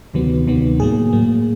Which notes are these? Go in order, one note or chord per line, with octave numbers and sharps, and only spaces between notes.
D2 C3 D#3 F#3 B3
D2 C3 D#3 F#3 B3
A2 F#3 A#3 G#4
A2 F#3 A#3